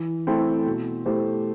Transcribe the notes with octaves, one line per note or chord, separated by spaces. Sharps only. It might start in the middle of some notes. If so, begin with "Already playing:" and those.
Already playing: E3
A3 C4 E4 A4
B2
A3 E4 G4 C5